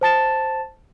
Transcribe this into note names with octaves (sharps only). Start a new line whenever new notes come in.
C5 A5 A6 E7